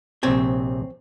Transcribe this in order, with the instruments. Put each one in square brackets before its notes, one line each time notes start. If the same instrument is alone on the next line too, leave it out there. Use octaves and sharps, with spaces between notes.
[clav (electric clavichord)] A#1 C3 A5 [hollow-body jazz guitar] C4 C#5